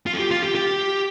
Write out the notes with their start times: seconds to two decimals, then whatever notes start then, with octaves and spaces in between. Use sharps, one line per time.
0.06 F4
0.13 A4
0.18 G4
0.31 F4
0.42 G4
0.55 G4